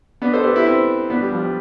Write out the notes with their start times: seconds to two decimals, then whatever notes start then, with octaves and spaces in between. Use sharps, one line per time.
0.22 B3 D4
0.33 A4 C5
0.44 G4 B4
0.56 E4 G4
0.66 C4 E4
1.10 B3 D4
1.21 G3
1.32 F3
1.43 G3